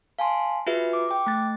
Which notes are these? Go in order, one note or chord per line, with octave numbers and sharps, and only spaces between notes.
F5 G#5 A5 C6
F4 F#4 G#4 B4 E5
D6
G5 D6
A3 A6